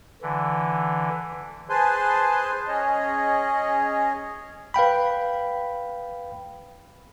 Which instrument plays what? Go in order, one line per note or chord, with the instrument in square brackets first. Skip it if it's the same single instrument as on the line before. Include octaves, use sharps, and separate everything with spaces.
[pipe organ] D3 E3
[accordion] G#4 B4 C5 G#5 A5 C6
C#4 G#4 C#5 D#5
[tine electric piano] B4 F5 G5 B5